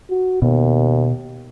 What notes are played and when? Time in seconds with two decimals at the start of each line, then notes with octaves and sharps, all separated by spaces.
0.10 F#4
0.42 D#2 B2